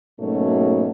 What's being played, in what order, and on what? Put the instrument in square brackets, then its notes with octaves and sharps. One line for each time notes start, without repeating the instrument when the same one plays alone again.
[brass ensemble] G#2 B2 F#3 A3 A#3 C#4